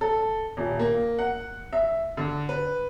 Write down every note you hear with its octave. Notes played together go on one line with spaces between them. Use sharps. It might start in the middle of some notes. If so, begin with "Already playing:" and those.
A4
D#1
A#3
F#5
E5
D3
B4